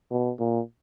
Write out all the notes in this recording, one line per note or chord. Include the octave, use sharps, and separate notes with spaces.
B2
A#2